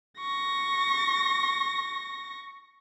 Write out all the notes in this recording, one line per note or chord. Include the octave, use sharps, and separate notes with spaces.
C#6 A#6